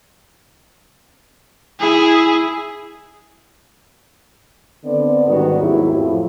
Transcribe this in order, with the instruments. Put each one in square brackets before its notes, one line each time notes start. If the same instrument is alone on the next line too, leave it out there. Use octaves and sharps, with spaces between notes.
[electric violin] E4 G#4
[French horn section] D3 B3 C4 D5
G#2 D#3 G3 B3 C#4 F#4
D#2 G#2 F#3 G#3 E4 G4
F2 A2 F3 F#3 E4 F4